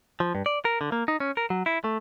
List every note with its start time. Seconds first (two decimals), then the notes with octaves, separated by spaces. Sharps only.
0.20 F3
0.35 G2
0.46 D5
0.65 A#4
0.81 D3
0.92 A#3
1.08 D#4
1.20 C#4
1.37 A#4
1.50 F#3
1.66 E4
1.84 A3